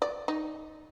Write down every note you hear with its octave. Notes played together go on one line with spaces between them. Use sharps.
D5
D#4